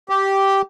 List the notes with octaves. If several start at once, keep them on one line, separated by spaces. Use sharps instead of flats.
G4